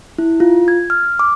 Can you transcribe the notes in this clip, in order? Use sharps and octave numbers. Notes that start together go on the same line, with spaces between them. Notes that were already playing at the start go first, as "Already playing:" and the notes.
E4
F4
G#6
F6
D6